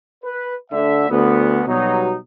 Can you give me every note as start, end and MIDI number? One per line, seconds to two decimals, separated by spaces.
0.24 0.55 71
0.72 1.08 38
0.72 1.08 50
0.72 1.08 76
1.10 1.62 38
1.10 1.62 59
1.68 2.16 47
1.68 2.16 54
1.68 2.16 55
1.68 2.16 63